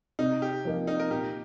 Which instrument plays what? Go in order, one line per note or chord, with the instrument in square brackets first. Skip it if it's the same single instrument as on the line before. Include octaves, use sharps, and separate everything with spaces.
[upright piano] C3 [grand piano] D#4
[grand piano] G4
[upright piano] F3 A#3 D#4
[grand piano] D#4
A#4
[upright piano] A#2 [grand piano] G4